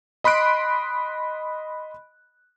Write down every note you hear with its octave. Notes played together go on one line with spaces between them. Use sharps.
D#5 B5 C6 F#6 D7